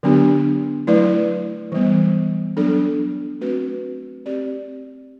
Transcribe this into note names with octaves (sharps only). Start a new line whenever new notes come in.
D3 F#3 B3 D4 G4
F#3 A3 E4 B4 D5
E3 G3 B3
F#3 B3 D4 A4
A3 C4 F#4 B4
C4 G4 D5